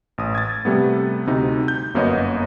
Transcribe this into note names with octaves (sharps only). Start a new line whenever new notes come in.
A1 D#6
G#6 A6
C3 G3 A3 B3
D2 C3 D#4
G6
G1 F#2 A#3 B3 C#5 D#5